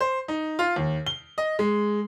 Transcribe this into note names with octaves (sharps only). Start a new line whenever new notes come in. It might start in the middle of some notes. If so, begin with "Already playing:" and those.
C5
D#4
F4
D#2
G7
D#5
G#3